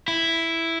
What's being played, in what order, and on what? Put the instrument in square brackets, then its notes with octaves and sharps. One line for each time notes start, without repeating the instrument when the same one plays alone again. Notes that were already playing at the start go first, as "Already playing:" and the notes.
[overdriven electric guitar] E4